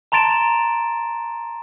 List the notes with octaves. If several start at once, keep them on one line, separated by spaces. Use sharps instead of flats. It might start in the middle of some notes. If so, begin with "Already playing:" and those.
A5 A#5 C6 A6 D7 E7